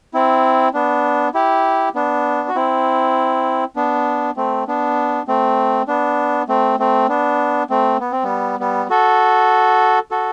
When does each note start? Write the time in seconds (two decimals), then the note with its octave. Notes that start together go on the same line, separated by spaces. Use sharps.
0.14 C4 E4
0.74 B3 D4
1.34 E4 G4
1.95 B3 D4
2.48 F#4
2.55 C4 E4
3.76 B3 D4
4.36 A3 C4
4.68 B3 D4
5.28 A3 C4
5.88 B3 D4
6.48 A3 C4
6.79 A3 C4
7.09 B3 D4
7.70 A3 C4
8.00 B3
8.12 C4
8.23 G3 B3
8.60 G3 B3
8.90 F#4 A4
10.11 F#4 A4